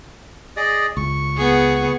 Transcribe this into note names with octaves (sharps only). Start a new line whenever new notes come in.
G#4 D5 D#5
C#2 C#6
B3 G#4